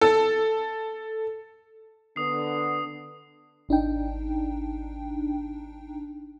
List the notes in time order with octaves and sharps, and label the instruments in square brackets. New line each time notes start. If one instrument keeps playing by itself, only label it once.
[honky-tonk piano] A4
[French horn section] D3 B3 [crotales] D#6 C7
[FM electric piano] G#1 D4 D#4 G5